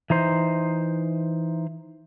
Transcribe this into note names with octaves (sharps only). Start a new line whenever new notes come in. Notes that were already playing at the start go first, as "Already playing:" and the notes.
E3 D#4 C5